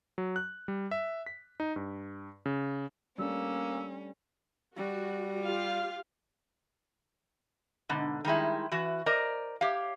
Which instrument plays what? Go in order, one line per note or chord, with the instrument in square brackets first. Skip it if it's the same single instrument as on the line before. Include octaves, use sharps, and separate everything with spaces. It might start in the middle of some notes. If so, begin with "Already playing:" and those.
[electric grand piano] F#3
F#6
G3
E5
B6
D#4
G2
C#3
[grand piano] G3 A3 D4 [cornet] A#3 [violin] C#4 [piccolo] E6
[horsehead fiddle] G3 [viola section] F#4
[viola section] F4 G4 F5
[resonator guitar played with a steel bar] G#2 B2 D3
D#3 G3 G#3 E4
E3 F#4 B4
A#4 C5 D5 D#5 A#5
G4 C#5 F5